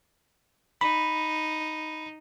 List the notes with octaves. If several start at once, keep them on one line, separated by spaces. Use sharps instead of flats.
D#4 B5